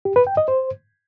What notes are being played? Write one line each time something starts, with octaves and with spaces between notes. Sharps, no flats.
G4
B4
G5
D#5
C5